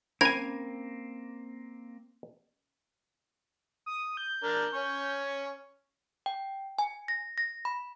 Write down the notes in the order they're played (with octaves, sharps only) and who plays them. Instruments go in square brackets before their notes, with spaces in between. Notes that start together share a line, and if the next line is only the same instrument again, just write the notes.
[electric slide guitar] A#3 C4 [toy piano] C#4 B5 [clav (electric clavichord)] A#4 G#5 [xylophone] G#6
[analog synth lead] D#6
G6
[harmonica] D4 A#4
C#4 C#5
[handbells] G5
G#5
A#6
A#6
B5